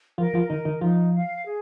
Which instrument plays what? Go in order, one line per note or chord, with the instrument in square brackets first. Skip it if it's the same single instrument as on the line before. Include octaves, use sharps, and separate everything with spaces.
[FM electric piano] F3 F4 [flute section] A#4
[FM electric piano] F3 F4
[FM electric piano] D#3 D#4 [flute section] A#4
[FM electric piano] D#3 D#4
[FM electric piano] F3 F4 [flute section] D#4
[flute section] F5
G#4